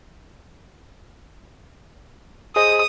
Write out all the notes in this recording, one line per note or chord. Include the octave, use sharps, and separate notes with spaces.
G#4 C5 D#5 D#6